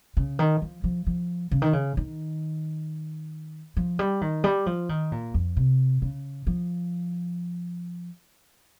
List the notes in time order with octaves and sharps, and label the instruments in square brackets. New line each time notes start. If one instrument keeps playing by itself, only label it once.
[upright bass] C#3
D#3
F3
F3
F3
C#3
D#3
C#3
D#3
F3
G3
D#3
G3
F3
D#3
A#2
F2
C3
C#3
F3